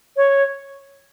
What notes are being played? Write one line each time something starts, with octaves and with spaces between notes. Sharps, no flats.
C#5